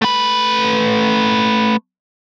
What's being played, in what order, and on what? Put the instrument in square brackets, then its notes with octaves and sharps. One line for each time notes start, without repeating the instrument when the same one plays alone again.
[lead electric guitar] A3 B4